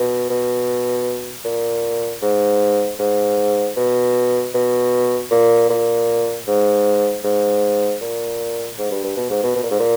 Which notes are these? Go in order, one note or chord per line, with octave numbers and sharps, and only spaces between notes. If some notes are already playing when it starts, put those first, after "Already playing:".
Already playing: B2
B2
A#2
G#2
G#2
B2
B2
A#2
A#2
G#2
G#2
A#2
G#2
G2
G2
B2
G#2
B2
B2
A#2
G#2
A#2